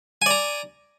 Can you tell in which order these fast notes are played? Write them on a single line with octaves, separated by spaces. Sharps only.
G#5 D5 A#5